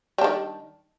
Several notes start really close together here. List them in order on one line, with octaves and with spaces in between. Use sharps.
G3 D4 D#3